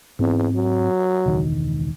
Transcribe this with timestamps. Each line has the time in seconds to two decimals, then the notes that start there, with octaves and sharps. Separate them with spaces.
0.19 E2 G#2 C4
0.55 F#3
1.26 E1 C#2 D#3